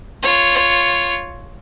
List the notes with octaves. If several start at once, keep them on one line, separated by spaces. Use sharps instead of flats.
F4 C#5